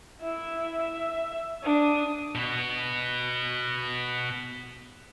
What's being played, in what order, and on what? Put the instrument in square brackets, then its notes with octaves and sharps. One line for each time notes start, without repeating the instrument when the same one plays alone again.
[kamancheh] E4 E5
E5
D4 D#6
[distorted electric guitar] B2 B3